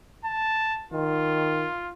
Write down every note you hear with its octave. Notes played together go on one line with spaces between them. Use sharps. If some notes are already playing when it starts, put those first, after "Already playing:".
A5
D#3 F4